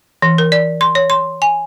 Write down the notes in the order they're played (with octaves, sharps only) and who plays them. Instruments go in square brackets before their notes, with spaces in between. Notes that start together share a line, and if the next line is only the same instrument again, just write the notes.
[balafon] E3
A#4
D5
C6
C#5
C6
G#5